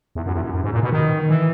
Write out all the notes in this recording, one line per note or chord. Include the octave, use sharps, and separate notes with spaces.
E2
F#2
E2
F#2
F#2
G#2
A#2
B2
D#3
E3